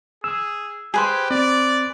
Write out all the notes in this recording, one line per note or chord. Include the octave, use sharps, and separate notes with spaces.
G#4 E6
G4 G#4 B4 C5
C4 D5